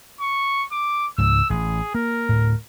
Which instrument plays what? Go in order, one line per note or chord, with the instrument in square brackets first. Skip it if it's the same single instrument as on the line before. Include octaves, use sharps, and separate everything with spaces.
[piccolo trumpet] C#6
D6
[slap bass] C#2 G#2 [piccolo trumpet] E6
[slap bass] A1 [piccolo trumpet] G#4
[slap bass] A#3 [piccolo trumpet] A#4
[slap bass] D2 A2